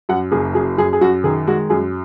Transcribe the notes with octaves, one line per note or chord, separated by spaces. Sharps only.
F#2 F#5
F#1 G#4
F#2 G#4
F#2 G#4
G#4
F#2 F#4
D#3 G#4
G#3 F#4
F#2 G#4